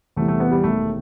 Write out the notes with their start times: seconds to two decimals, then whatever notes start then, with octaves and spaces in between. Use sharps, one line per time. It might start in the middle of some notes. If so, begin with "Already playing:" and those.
0.16 E2 C3 E3 G3 A3
0.28 A3
0.40 B3
0.51 G3
0.64 E1 D#2 D#3 A3